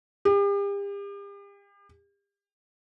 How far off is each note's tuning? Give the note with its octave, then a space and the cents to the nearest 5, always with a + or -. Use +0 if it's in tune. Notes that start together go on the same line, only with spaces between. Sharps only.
G4 +40